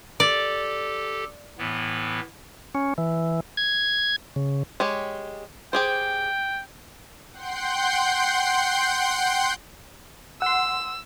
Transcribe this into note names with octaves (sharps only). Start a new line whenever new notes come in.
G4 A4 D5
A2 E3 B3
C#4
E3
G#6
C#3
G#3 G4 C#5
G4 G#4 C5 G5
F#5 G5 C6 G6 C7
F#5 C6 E6